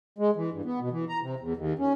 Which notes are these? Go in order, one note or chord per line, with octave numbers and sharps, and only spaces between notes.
G#3
E3
G2
B3
B2
E3
A#5
C3
E2
D#2
C#4